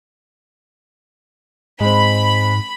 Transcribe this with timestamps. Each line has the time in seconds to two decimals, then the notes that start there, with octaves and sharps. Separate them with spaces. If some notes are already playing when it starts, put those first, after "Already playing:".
1.80 G#2 G#3 C4 B5